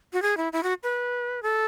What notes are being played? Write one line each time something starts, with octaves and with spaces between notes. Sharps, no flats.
F#4
G#4
E4
E4
F#4
B4
A4